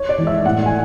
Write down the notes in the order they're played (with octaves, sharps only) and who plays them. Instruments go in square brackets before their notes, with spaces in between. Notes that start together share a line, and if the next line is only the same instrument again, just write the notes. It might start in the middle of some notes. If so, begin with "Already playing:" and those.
Already playing: [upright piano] C#5
D5
E3 G#3
E5
A2 F#5
G#5